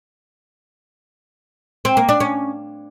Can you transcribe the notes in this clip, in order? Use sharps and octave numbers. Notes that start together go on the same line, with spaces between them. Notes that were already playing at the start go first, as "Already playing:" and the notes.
C4
A#3
D4
C#4